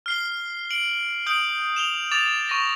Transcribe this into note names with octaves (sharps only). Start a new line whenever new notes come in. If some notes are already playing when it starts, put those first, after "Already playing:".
F6 C7 G7
D7 F#7
D#6 G6 D7 F#7
E7 F7 G7
D6 A6 E7 F7
C#6 A#6